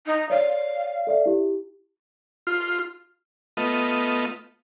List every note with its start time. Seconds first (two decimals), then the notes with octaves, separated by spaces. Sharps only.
0.07 D#4
0.30 C#5 D5 F5
1.07 A4 D5 E5
1.26 E4 G4
2.47 F4
3.57 A3 B3 F4 D#5